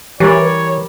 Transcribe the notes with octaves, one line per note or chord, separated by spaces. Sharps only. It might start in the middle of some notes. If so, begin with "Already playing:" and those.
E3 G3 A#4 C#5 D5